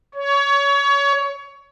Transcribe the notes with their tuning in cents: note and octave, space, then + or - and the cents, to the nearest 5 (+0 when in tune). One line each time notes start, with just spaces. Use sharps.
C#5 +20